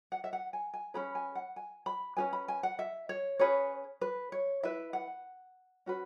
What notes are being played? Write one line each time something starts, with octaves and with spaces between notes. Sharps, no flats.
F#5
E5
F#5
G#5
G#5
C#4 G#4 B4 B5
G#5
F#5
G#5
B5
C#4 G#4 B4 G#5
B5
G#5
F#5
E5
C#5
C#4 G#4 B4 C#5
B4
C#5
E4 B4 E5
F#5
C#4 F#4 B4